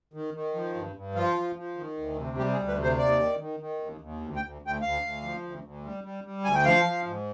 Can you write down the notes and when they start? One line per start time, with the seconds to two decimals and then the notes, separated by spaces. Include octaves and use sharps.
0.14 D#3
0.34 D#3
0.54 F3
0.75 G2
0.96 G2
1.15 F3 F4
1.36 F3
1.56 F3
1.77 D#3
1.97 D2
2.17 C3
2.37 G3 G4
2.53 G#4
2.58 D2
2.68 B4
2.78 C3 C5
2.98 D#2 D5
3.19 D#3
3.40 D#3
3.60 D#3
3.80 D#2
4.01 D#2
4.21 D2
4.36 G5
4.42 D2
4.62 D2
4.67 G5
4.81 D2 F5
5.02 D2
5.22 F3
5.43 D2
5.64 D2
5.84 G3
6.04 G3
6.24 G3
6.44 D2 G#5
6.55 G5
6.65 F3 F5
6.85 F3
7.06 G#2